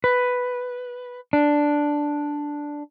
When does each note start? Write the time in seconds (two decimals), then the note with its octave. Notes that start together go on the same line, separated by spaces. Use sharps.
0.04 B4
1.33 D4